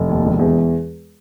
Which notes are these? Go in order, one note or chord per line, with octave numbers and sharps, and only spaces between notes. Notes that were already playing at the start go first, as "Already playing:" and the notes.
Already playing: F1
D#2
E1
E2